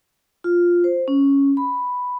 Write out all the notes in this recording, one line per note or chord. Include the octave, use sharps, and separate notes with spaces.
F4
C5
C#4
B5